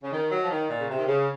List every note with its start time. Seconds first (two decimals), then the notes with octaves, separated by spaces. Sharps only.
0.03 C#3
0.12 D#3
0.31 F#3
0.43 F3
0.50 D#3
0.70 A#2
0.80 C#3
0.89 C3
0.98 D#3
1.08 C#3